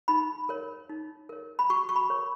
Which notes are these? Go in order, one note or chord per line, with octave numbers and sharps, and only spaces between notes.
D#4 B5
A#4 C#5
D#4
A#4 C#5
B5
F#4 C#6
C#6
B5
A#4 C#5